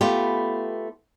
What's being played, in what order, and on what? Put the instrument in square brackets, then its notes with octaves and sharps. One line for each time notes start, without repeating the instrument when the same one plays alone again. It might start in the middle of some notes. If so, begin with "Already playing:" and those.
[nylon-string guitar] A3 B3 F4 G4